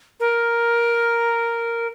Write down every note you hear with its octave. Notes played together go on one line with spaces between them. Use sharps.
A#4